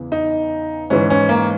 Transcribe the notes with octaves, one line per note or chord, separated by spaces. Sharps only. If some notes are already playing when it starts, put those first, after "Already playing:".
Already playing: E2 C#3 E3
D#4
G#2 E3 C#4
C#4
A#3